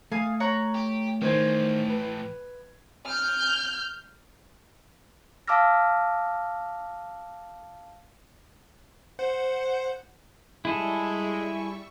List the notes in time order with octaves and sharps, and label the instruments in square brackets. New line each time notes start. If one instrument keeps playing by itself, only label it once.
[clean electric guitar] A3 [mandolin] F5 G#5 D#6
[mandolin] C#5 F#5 A#5
[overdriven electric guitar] G4
[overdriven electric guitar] A2 E3 [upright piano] D#3 C5 G#6
[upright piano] B4
[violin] F6 G6
[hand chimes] F5 A5 D6 E6 F6 A#6
[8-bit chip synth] C5 F#5
[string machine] G3 E5 C#6 [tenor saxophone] G#3 [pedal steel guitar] E4 G#4 A4